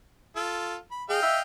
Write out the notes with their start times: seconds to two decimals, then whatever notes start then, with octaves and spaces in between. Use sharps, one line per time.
0.36 F4 A4
0.91 B5
1.10 G#4 D#5 F5 G5
1.22 E5